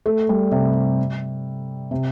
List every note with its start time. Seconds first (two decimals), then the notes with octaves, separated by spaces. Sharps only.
0.06 A3
0.29 G3
0.52 C3
1.91 C3